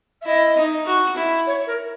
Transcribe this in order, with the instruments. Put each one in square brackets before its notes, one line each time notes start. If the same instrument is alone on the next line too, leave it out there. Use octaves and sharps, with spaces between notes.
[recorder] E5
[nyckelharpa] E4 [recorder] D#5
[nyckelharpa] D#4
F#4
E4
[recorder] C#5
A#4